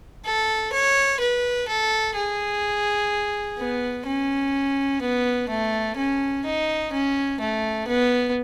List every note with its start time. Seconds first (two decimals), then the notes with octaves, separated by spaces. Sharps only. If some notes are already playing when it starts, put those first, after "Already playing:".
0.25 A4
0.73 C#5
1.20 B4
1.68 A4
2.15 G#4
3.58 B3
4.06 C#4
5.01 B3
5.49 A3
5.96 C#4
6.45 D#4
6.92 C#4
7.40 A3
7.88 B3